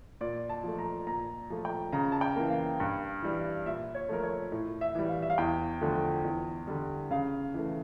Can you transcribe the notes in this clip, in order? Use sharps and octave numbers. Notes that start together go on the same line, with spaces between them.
A#2 D5
A5
F3 A3
A#5
A#2 A#5
F3 A3
G5
C#3 A#5
A5
G5
E3 A#3
F5
G2
E3 G3
A#2 E5
C#5
F3 A3 A#4
C#5
A2
E5
E3 G3
F5
E5
F5
E2 G5
D3 F3 A3
E2
D3 G3
C#3 F5
E3 A3